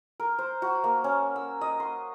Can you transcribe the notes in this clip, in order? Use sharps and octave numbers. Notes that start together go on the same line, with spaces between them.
A#4
C5
F#4
A#3
C#4
E6
D#5
C6